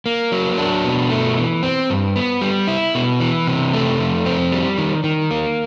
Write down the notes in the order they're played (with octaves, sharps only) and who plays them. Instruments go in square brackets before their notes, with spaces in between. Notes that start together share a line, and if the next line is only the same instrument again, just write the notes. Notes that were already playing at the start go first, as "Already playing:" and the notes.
[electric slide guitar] A#3
F#3
D4
B2
A3
E3
C4
G2
B3
G3
E4
B2
E3
C3
A3
F2
C4
G3
D#3
D#3
A#3